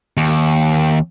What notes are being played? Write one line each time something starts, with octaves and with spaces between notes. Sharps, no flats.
D#2